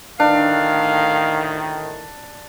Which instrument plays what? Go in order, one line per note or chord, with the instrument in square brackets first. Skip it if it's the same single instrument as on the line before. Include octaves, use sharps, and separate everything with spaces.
[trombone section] D2 A2 D#3 [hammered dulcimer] D4 [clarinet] F5